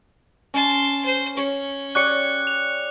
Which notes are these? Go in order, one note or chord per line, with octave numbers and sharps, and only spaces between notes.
C#4 A5 C6
C5
C#4 C#5
G4 C#5 D5 F#6 C#7
F7